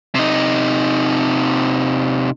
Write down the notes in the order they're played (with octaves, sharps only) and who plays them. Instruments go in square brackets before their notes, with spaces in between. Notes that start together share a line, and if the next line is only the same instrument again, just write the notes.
[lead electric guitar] C3 D#4